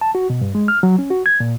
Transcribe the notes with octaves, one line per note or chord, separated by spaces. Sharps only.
A5
F#4
B2
G2
G#3
F6
F#3
C#4
F#4
G#6
A#2